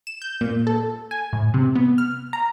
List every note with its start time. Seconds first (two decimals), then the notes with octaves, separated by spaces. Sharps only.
0.07 E7
0.22 G6
0.41 A#2
0.67 A4
1.11 G#5
1.33 A2
1.54 C3
1.75 B3
1.98 F6
2.33 A#5